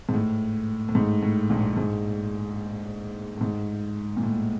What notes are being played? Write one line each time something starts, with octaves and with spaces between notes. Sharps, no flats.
G#2
A2
A2
G#2
A2
A#1 A#2
G#2
A2
G#2
A#2
A2